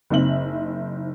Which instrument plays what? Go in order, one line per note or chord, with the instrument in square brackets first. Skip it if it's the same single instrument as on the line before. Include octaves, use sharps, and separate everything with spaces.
[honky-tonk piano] F#1 C4 D#4 E5 F#7